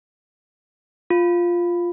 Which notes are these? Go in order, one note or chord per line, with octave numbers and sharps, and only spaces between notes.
F4